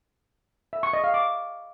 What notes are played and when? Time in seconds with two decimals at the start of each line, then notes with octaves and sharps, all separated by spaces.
0.73 E5
0.83 C#6
0.93 D#5
1.04 F5
1.14 D6